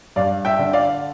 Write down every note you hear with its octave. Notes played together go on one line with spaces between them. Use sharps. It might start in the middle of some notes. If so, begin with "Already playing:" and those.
G2 D5 F5
E5 G5
D3
D5 F5